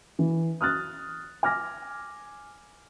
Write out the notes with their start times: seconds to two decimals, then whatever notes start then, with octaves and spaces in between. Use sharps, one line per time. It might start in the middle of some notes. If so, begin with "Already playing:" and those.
0.19 E3
0.61 D#6 F6 F#6 A6
1.43 G#5 D6 F6 A#6